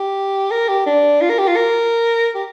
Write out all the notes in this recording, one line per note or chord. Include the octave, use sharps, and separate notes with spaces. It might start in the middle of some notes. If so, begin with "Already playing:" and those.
Already playing: G4
A#4
G4
D4
F4
A#4
G4
F4
A#4
G4